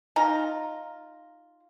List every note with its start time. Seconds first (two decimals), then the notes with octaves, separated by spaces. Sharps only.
0.16 D#4 F4 A#5